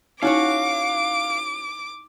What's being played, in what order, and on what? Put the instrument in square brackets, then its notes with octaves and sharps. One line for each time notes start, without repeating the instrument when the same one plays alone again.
[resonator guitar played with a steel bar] C#4 F#4 C#5 [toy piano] D#4 E4 [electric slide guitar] F5 [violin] D6